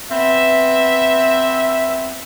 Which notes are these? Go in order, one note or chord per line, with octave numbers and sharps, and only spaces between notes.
B3 C4 B4 E5